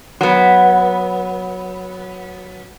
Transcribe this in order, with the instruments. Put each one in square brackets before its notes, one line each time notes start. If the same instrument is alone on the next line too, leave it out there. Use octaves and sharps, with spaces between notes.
[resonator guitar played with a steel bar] F#3 B3